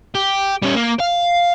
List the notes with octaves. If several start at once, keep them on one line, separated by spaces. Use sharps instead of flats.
G4
G3 C#4
A#3
F5